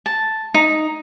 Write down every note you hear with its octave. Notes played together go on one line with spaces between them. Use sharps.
A5
D#4